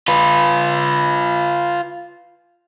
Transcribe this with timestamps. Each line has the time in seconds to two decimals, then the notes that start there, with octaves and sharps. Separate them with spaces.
0.08 F4 B4